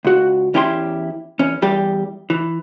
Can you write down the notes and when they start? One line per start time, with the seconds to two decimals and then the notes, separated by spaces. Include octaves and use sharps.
0.05 C#2 F#4
0.54 E2 C#4 E4 G4 A#5 C6
1.39 E2 C#4
1.62 E2 G3 G4
2.30 E3